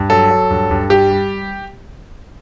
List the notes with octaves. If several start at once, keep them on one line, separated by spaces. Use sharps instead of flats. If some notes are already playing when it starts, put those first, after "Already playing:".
Already playing: G2
F#3 A4
F#3
G2
G2
G3 G4
G3